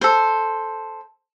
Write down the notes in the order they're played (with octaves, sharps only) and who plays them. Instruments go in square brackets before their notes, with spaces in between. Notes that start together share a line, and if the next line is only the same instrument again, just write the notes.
[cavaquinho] A4 C5